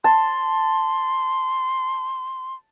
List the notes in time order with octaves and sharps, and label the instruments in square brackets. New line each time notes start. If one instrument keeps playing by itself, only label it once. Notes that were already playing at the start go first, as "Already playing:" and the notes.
[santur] A5 [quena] C6